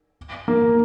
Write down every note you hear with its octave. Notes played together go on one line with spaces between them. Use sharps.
A#3